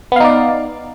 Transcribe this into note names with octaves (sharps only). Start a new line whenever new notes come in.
B3 D#4 D5 F5